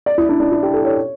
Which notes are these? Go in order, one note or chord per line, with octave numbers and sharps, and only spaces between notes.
D5
E4
D4
D4
E4
G4
A4
C#5